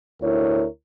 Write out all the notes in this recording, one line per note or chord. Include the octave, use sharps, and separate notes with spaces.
D2 E4 A#4 C#5